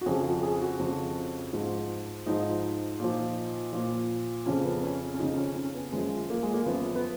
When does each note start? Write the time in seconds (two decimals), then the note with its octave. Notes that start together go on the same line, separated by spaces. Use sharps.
0.01 F#4
0.06 F2 C#3 F3 G#4
0.25 F#4
0.43 G#4
0.62 F#4
0.79 F2 C#3 F3
1.53 G#2 F3
2.26 G#2 F3 D#4
3.00 A#2 F3
3.73 A#2 F3
4.46 F2 C#3 F3 C#4
4.65 B3
4.83 C#4
5.14 C#4
5.19 F2 C#3 F3 D#4
5.37 C#4
5.56 C#4
5.74 B3
5.93 F#2 F3 G#3
6.30 A#3
6.43 G#3
6.54 A#3
6.66 F#2 F3 B3
6.96 B3